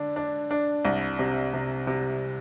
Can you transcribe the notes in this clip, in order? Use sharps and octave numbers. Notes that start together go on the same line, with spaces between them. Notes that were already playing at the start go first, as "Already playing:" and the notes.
Already playing: D3 D4
D4
D4
C2
C3
C3
C3